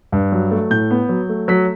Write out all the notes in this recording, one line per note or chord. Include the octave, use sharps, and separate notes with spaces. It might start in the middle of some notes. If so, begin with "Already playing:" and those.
G2
F#3
A3
A2 G6
B3
F#3
A3
F#3 B6